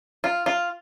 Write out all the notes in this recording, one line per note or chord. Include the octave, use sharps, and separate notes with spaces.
F4
F4